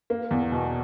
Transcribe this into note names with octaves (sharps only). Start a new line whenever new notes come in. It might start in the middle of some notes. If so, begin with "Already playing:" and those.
A#3
E2
B2